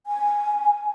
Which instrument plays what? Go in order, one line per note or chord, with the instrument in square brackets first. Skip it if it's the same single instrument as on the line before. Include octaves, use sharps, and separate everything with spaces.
[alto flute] G#5